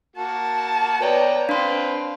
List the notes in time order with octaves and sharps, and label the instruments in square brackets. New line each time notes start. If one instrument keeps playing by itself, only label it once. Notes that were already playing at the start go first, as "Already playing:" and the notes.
[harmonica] A#3 F#4 [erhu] A5
[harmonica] B3 G5 A#5 [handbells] B4 C#5 D5
[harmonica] C4 B4 F5 [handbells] D4 C6